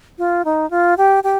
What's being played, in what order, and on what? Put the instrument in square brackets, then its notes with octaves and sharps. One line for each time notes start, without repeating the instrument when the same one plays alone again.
[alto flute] F4
D#4
F4
G4
G4